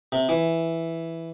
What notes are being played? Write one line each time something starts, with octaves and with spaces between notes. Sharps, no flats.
C3
E3